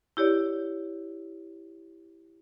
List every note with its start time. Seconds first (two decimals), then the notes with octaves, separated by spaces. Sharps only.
0.17 E4 G4 C#5 D5